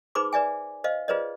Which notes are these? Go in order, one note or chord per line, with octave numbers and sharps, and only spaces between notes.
D#4 G#4 B4 C5 B5 D6
B4 D5 E5 G#5
C5 D#5 F5
F4 G#4 B4 C5 D5 D#5